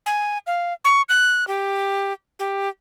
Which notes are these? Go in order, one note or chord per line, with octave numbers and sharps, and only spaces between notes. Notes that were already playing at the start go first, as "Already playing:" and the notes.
G#5
F5
C#6
F#6
G4
G4